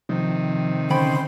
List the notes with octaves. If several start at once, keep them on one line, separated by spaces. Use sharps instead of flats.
C3 D#3 F3
D3 C#4 C5 G5 B5